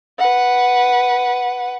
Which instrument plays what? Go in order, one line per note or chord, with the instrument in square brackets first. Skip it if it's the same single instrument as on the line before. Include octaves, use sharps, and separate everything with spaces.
[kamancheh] B4 F#5